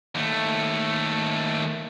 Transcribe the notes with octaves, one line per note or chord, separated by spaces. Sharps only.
D#2 A3